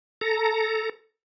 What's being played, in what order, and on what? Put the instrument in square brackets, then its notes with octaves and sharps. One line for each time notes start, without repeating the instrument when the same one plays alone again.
[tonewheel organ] A4 A#5